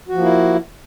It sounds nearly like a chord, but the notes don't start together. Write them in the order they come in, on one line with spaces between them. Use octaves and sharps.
F#4 F3 A#3 E4